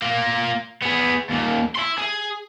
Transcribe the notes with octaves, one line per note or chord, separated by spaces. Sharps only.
A#3 F4
B3 G#4
D#2 A#2
E4 C6
G#4